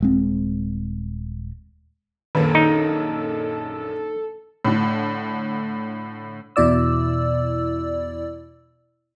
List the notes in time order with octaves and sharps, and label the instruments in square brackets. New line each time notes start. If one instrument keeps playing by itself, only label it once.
[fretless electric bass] D#1 G#3 C4
[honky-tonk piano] A#1 F#2 A#3 [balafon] D#3 [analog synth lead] A4
[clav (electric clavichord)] D#4
[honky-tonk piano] A2 D3
[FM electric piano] E2 B2 E4 D5 E6